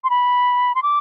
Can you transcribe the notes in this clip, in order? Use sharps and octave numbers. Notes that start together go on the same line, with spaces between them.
C6
B5
C6
D6